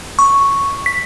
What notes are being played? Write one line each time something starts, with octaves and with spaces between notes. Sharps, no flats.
C#6
B6